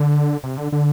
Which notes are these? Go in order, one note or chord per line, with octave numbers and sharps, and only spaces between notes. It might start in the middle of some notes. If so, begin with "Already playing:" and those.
Already playing: D3
C3
D3
D3